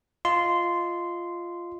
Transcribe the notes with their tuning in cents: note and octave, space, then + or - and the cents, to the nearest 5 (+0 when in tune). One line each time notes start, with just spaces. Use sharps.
F4 -5 D#5 +0 C6 -10